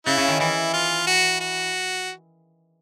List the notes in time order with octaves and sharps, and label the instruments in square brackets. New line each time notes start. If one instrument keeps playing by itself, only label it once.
[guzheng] C#3 [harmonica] E4
[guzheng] C#3
D#3
[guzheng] E3 [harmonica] E4
[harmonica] F4
F#4
F#4